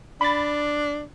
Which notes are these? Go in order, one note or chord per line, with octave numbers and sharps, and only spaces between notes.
D4 B5 A6